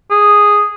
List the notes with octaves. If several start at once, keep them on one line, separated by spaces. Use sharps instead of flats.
G#4